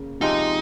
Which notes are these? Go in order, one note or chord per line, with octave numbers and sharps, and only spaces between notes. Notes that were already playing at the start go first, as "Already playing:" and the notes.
Already playing: C#3 A#3
C3 F3 G#3 C4 D#4